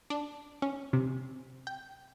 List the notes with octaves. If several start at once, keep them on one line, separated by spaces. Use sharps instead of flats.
D4
C#4
C3
G5